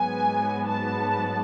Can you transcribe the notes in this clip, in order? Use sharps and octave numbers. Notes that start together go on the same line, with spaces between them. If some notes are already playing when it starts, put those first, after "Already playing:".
Already playing: G#2 F#3 B3 G#5
A5